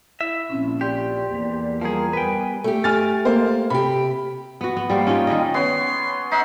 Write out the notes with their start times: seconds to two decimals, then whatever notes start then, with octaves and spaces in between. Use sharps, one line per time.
0.21 E4 E5
0.50 A#1 F3 C4 C#4
0.81 G4 D5 C6
1.28 E2 A#3
1.81 F3 G3 G#4 A#4 A#5 D#6
2.13 G3 B3 A#4 B4 G5 G#5
2.64 A3 G4
2.84 G#5 F6 A6
3.25 A#3 C5
3.70 C3 G4 B5
4.61 B3 F#4
4.77 B3
4.90 G3 A#3 C5
5.07 C#4 D#4 F4 G5
5.27 D#3 G3 G#3 D#5
5.54 B3 C#4 C6
6.32 D#4 E5 F#5 C6